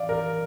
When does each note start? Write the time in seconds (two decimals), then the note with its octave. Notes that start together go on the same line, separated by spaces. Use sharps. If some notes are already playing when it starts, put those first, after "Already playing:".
Already playing: D5 F5
0.09 A#4